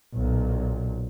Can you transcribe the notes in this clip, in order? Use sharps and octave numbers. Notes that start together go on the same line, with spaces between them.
B1 A#2